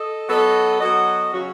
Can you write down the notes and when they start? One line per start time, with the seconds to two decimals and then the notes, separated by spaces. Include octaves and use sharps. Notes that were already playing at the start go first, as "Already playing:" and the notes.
Already playing: A4 D#5
0.27 F#3 B3 F#4 A4 D#5
0.80 F#3 B3 F#4 A4 D#5
1.33 C#3 F#3 C#4 F#4